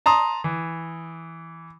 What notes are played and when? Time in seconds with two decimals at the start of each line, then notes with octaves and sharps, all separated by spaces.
0.06 A5 A#5 C6 D#6
0.44 E3